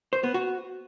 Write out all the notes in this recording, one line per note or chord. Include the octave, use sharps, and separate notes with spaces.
C5
B3
F#4